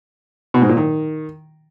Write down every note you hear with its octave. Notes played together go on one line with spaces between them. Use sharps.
B2
G#2
A#2
D#3